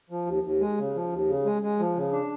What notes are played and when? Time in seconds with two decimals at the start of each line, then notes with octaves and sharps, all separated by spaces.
0.10 F3
0.26 D#2
0.43 D#2
0.60 G#3
0.78 C#3
0.95 F3
1.12 D#2
1.28 C#3
1.45 G#3
1.62 G#3
1.79 F3
1.96 C#3
2.12 D4